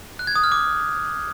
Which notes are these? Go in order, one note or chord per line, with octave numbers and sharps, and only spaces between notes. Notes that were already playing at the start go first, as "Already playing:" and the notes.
F#6
G#6
D#6
F6
D6